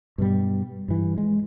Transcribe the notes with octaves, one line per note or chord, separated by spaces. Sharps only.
G2 B2 G3
G2 E3
G#3